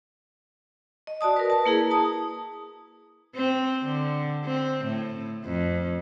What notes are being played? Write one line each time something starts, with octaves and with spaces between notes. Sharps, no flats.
D#5
F#4 D5 A5 D#6
A#4 B4
B4 A5
A#3 E4 G#4
A5 D#6
C4
D3
C4
A2
F2